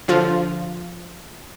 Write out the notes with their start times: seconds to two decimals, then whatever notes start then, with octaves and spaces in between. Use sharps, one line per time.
0.08 D3 F3 F4